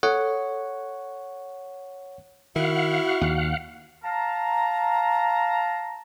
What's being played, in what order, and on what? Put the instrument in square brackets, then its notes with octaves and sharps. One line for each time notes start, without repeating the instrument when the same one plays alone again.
[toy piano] A4 [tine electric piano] C#5 F#5
[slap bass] D#3 [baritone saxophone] E4 [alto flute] F#4 [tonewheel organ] F5 F#5
[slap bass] D#2
[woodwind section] F5 A5 A#5